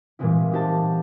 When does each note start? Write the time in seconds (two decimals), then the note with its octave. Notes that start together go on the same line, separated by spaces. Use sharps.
0.19 A#2 E3 G3 G#3 C4 E4
0.52 D#4 F#4 G4 C5 A5